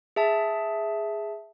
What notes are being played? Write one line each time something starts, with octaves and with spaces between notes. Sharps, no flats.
G#4 E5 A5